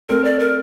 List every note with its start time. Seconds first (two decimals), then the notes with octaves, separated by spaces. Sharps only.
0.09 A3 C4 A#4
0.24 D5
0.39 A#4